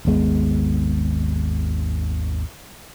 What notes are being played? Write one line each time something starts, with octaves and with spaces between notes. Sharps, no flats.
G#1 D#2 G#3 B3